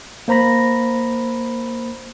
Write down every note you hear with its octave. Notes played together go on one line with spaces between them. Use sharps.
A#3 C5 A#5 B5 A#6